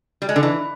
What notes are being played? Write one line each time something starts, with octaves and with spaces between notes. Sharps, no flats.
G3
G#3
D3
E3